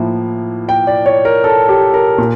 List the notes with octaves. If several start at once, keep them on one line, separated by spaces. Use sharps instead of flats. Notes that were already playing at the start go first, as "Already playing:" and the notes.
Already playing: A2 F3 A#3 E4
G5
D5
C#5
A#4
A4
G4
A#4
A#2